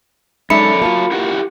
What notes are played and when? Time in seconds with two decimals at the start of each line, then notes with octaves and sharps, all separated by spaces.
0.50 F#2 G#3 D#4 A4 D5 E5 B5 C#7
0.82 A#3 F4 F#4 F5 A5
1.11 E4 G4 F#5